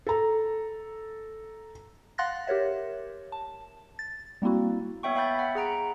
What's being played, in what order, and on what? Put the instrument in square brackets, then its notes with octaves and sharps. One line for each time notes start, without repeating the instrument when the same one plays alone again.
[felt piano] A4 A#5
[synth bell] F5 F#5 C6 F#6 A6 A#6
G4 A#4 C#5 E5
A5
A6
G3 A#3 C4 E4 F#4
[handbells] B3 C#5 E5 G5 C#6
E5 F5 G5 B5 G6 A6
F#5 B5
G#4 F#5 A#5 D7